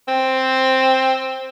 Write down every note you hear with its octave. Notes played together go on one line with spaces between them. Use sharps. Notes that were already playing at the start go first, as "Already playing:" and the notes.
C4